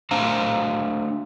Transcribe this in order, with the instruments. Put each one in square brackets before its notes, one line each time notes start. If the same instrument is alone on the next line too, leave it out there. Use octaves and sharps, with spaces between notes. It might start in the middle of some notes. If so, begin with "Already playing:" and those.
[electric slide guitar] A3 D4 C5 F5 A#5